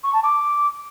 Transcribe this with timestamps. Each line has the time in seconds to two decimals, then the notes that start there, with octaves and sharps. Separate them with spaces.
0.03 C#6
0.13 A5
0.23 D6